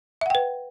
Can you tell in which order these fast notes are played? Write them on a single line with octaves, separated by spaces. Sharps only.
E5 F#5 G5 B4